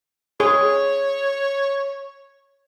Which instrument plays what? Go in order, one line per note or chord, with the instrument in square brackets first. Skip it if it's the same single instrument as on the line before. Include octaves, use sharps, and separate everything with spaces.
[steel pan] G#4 [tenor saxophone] C#5